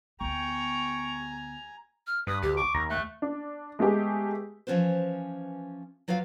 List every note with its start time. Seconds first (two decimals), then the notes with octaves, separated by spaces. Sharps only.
0.21 D2 B3 G5 G#5 A#5 C#6
2.07 F6
2.27 G2 B4 D#6
2.43 D2 G4
2.57 C#6 D6
2.74 D#2 A#5
2.90 A3 F#6
3.22 D4
3.79 G#3 A3 B3 G4 G#4
4.67 E3 F3 C4 C#4 B4 C5
6.08 F#3 F4 B4 D5 F5